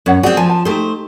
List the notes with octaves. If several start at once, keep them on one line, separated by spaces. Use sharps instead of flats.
F#2 C#4 C#5 F#5
C4 F#4 G#4 D5 F#5
F3 G#5 A5
A5
A3 D#4 G4 G#4 C5